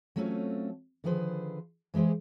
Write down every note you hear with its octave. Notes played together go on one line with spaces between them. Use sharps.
F#3 A3 C4 C#4 F4 A4
D3 D#3 F3 G#4 B4 C5
E3 G#3 G4 G#4 C5